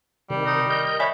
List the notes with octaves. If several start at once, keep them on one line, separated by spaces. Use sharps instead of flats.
C3 D#3 G3
D#4
A#4 D#5 G6
C#5 D5 E5 G#5 B5